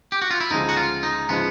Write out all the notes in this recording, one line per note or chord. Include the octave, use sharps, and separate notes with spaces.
G4
F#4
F4
E4
D2 C#3 F3 G#3 D#4
F#4
F4
D#4
C#3 F3 G#3 B3